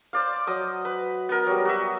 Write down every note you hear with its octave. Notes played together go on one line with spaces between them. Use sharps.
C5 D5 F5
F#3 D#5 D#6
B4
B3 A#4
F#3 G3
F#4 D#5 E5